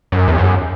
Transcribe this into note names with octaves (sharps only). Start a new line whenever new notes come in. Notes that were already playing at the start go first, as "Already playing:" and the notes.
F#2
E2
F#2